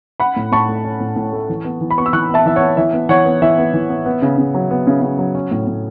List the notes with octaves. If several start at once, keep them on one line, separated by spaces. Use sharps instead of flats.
C#4 F#5 B5
A2
A2 A5 C#6
A3
C#4
A2
A2
A3
E3
B3
E3
B5
B3 C#6
E6
E3 C#6 F#6
B3
E5 A5
E3 E5
B3 C#5 F#5
E3 E5
B3
E3 C#5 F#5
B3
E3 E5
B3
E3
B3
B3
C#3
C#3
F#3
B3
C#3
C#3
F#3
C#4
A2
A2